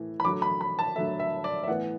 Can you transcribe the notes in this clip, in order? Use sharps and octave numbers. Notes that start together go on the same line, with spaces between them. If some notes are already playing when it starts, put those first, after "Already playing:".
Already playing: A2 E3
B5
D3 F#3 A3 D6
B5
B5
A5
D3 F#3 A3 E5
E5
D5
E5
A2 E3 B3 F#5